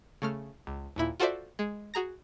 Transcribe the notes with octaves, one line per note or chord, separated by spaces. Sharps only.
C#3 A3 F6
C#2
D#2 A#2 E4
F4 F#4 A4 C5 D5 E5
G#3
F#4 G#4 A#5 A#6